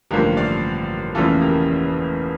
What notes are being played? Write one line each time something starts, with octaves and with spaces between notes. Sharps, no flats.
A1 G2 D3 F3 A#3 G4 A#4
D5 F5
F1 E2 C#3 E3 A#3 F4 A4
G4 A#4